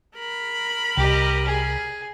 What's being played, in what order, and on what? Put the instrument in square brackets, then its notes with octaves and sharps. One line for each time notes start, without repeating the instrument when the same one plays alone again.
[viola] A#4 B5
[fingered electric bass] C2 [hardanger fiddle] G4 D#5
[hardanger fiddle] G#4